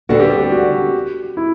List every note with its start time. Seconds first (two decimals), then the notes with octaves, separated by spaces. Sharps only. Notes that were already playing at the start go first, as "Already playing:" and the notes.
0.09 D2 D3 G3 B3 F#4
0.20 G4
0.30 G4
0.52 F#4
1.37 E4